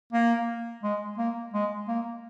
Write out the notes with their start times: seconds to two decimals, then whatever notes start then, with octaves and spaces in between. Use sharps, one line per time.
0.13 A#3
0.83 G#3
1.18 A#3
1.54 G#3
1.88 A#3